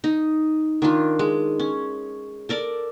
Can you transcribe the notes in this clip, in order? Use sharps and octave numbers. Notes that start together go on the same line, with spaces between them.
D#4
D#3 D4 F4
G#3
C#4
A4 A#4 D5